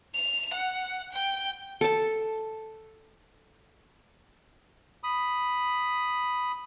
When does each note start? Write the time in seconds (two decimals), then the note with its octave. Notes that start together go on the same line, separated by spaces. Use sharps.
0.14 F7
0.53 F#5
1.12 G5
1.81 A4 A5
5.03 B5 D#6